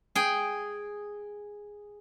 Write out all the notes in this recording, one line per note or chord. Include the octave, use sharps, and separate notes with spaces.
G#4 G5